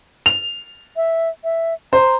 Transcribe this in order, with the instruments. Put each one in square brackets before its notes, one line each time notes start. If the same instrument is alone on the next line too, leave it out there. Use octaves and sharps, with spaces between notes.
[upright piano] F7
[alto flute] E5
E5
[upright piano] C5 [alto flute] A#5